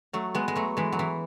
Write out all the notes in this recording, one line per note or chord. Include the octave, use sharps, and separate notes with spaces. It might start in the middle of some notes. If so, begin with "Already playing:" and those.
F#3 A3
G#3 B3
G#3
F#3 A3
E3 G#3
F#3
E3